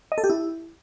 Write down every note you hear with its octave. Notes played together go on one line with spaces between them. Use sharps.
D#5
A4
G4
E4